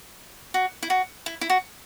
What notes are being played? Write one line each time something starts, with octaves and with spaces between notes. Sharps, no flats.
F#4
E4
F#4
E4
E4
F#4